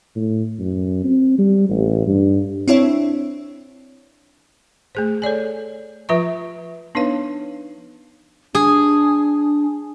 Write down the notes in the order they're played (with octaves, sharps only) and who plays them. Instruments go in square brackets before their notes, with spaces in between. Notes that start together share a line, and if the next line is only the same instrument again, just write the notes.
[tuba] A2
F#2
C4
G3
A1
G2
[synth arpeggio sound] C4 D4 E4 C#5 E5
[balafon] A3 G#4 C5
A4 C#5 D5 G#5
F3 F4 B4 E5 A#5 C#6
B3 D4 D#4 B4 C#5 F5
[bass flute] D4 [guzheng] G#4